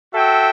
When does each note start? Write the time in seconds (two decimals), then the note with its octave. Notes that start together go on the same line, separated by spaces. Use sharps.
0.15 F#4 A4 E5 G5